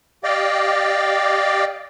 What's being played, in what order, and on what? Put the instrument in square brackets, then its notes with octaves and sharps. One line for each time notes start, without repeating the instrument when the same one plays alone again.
[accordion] G4 D5 D#5 F5 G5